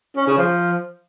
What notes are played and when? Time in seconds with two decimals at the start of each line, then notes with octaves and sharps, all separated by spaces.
0.16 C#4
0.27 C#3
0.38 F3